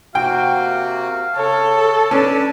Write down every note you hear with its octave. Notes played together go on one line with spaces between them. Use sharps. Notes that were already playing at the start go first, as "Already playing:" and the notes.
C3 A#3 F#4 F5 G5
C#3 A4 C#5
C#4 D4 B4